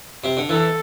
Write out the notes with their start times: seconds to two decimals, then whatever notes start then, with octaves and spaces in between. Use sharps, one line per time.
0.24 C3
0.37 D3
0.49 E3 A4